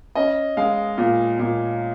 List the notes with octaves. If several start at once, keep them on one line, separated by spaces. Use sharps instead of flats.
C#4 D#5
G#3 F5
A#2
A#2